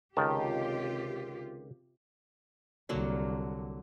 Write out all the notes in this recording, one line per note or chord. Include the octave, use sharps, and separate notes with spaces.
C#2 C3 D#3 F4 G4 A5
C2 D3 F#3 A#3